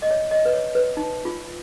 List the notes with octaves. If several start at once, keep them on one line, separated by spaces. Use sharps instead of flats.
D#5
C#5
D#5
B4
C#5
B4
D#4
F4